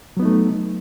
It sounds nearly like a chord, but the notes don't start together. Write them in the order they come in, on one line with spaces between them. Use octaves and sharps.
F#3 B3 D#4 A3